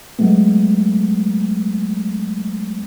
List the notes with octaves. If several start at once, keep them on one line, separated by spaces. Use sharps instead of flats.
F#3 G#3 A3 B3